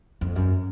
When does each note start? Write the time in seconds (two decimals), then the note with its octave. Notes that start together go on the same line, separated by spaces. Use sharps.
0.21 F2
0.36 F#2